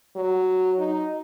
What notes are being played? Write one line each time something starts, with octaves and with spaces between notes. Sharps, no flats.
F#3
D#4